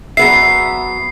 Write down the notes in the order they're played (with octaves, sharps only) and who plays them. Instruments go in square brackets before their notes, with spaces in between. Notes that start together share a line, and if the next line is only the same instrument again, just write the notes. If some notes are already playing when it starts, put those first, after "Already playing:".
[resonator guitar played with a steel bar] F#3 B3 E5 [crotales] C7